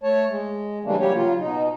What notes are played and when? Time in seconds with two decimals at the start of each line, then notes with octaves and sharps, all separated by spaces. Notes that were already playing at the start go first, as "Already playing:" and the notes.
0.03 A3 C#5 A5
0.29 G#3
0.85 C#3 E3 G3 A3 A#3 D4
1.00 F#3 G3 A#3 G4 C#5
1.14 C#3 F#3 F4
1.39 B2 D#4